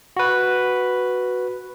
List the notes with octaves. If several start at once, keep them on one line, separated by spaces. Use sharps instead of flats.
F#4 B4